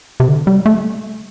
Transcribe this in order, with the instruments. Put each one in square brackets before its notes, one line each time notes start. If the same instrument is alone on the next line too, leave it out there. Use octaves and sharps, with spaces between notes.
[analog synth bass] C3
D3
G3
A3